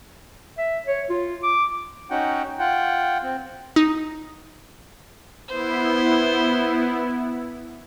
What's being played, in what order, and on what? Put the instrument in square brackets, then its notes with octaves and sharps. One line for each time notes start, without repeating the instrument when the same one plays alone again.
[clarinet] E5
C#5
F4
D6
[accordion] C#4 D#4 F#4 F#5 G5
F4 F#5 G5
C4
[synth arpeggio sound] D#4
[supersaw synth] B3 E4 [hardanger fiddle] C5